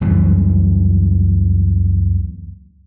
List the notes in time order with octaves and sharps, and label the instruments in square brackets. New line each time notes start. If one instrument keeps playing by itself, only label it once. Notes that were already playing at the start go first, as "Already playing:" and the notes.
[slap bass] C#2 F#2 E3 G3